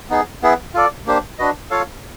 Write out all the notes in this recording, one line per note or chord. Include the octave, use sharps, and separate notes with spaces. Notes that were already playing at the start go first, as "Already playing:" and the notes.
B3 D#4 G#4
B3 E4 G#4 B4
F4 A4 D5
A#3 D4 G4 C5
D4 F#4 B4 D#5
F4 A4 C#5 F5